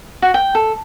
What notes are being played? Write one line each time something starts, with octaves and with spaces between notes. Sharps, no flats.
F#4
G5
A4